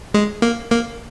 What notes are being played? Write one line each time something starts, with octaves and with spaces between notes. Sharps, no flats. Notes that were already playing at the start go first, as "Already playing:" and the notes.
G#3
A#3
A#3